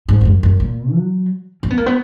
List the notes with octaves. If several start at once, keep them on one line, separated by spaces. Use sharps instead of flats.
G#2
E2
F#2
F#2
A#2
F#3
C#4
B3
A#3
B3